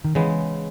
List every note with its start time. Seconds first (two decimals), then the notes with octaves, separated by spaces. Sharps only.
0.05 D#3
0.15 C#3 E3 G#3 B3